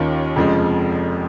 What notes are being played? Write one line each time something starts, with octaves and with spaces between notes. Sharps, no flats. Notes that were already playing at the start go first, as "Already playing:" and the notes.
Already playing: D#2 D#3 C#4 F4
F1 F2 C#3 F3 G#3